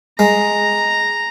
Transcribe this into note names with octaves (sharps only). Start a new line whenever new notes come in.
G#3 A#5